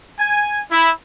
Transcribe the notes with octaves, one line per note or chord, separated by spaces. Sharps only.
G#5
E4